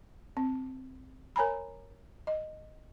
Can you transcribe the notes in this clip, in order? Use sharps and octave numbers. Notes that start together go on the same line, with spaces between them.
C4
A#4 C#5 G#5 A#5 B5
D#5